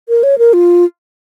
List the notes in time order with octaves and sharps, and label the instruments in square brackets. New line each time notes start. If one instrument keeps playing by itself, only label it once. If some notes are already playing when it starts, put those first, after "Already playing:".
[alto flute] A#4
C#5
A#4
F4